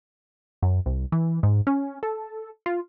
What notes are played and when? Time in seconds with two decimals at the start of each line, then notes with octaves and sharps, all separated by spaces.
0.62 F#2
0.86 C2
1.12 E3
1.43 G#2
1.67 C#4
2.03 A4
2.66 F4